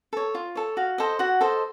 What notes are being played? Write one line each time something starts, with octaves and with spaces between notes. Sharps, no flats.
A4 C#5
F4
A4 C#5
F#4 F5
A4 C5 D#5
F#4 F#5
A4 C5 D#5